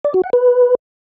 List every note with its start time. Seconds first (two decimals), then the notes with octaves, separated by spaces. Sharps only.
0.05 D5
0.14 F#4
0.24 F#5
0.33 B4